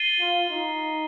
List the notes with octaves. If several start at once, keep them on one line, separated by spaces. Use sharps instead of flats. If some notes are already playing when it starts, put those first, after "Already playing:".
Already playing: A6 C7 D#7 G7
F4
D#4